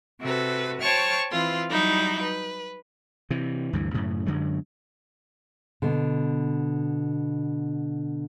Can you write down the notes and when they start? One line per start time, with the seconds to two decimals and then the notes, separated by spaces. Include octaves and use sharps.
0.21 C3 F#4 A4 B4
0.81 C5 C#5 G5 A5 C#6 F6
1.31 E3 C4 F4 B4 C6
1.70 F#3 G3 D#4 E4 G6
2.21 B4
3.30 C3 E3
3.73 D2 G2 E3
3.94 F#2 A2 C#3
4.26 F#2 D3 F#3 G#3
5.82 B2 D3